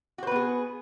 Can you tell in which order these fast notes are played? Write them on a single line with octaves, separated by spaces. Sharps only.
F#4 C5 B4 B3 G#4